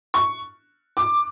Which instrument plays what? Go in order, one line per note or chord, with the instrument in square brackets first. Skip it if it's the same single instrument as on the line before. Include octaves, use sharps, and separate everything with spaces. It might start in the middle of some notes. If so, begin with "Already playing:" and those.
[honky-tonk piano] C#6
D6